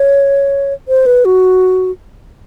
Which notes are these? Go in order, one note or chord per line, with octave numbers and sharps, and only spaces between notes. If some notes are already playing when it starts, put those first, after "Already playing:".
Already playing: C#5
C5
B4
F#4